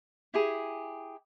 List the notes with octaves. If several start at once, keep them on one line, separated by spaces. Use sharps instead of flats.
E4 G4 G#4